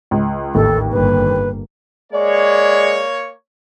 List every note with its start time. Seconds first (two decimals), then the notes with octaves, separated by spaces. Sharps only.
0.11 C#2
0.55 A1 D#2 A4
0.92 G1 A#3 B4
2.13 G#3 A#3 C#5 D5